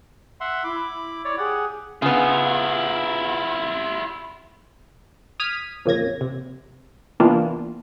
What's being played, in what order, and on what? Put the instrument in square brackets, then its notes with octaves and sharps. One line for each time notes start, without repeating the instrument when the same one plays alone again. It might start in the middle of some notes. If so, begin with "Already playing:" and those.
[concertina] E5 F#5 C6
[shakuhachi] E4 [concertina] B5 D6
[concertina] C#5 D5
[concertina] G4 F#5 [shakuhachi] G#4
[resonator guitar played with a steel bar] C#3 B3 [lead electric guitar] E4 F4
[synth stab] D#6 F6 G#6 B6 D#7
F2 A#2 C#3 G#6 A#6
C3
C3 E3 A#3 B3 D4 F4